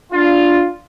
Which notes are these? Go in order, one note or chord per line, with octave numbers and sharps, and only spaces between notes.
D4 F4